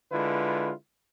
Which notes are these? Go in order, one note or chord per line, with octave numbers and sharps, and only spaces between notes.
D3 G#3 E4 F4 B4